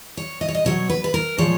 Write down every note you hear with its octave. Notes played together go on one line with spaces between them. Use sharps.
C#5
D#5
C#5
D#5
B2 F#3 C#5
B4
B4
A#4
A#2 F3 G#3 C#5